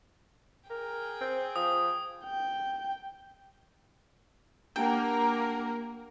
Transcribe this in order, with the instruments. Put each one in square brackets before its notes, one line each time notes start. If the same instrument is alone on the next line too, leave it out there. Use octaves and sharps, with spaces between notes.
[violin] G#4 G5 [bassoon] A#4
[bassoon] C4
[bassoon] F3 [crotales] D#6
[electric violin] G5
[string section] A#3 A#4 [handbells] D4 G4 F#5 [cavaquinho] G5 [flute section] A#5